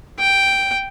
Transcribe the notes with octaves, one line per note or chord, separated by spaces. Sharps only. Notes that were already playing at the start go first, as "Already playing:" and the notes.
G5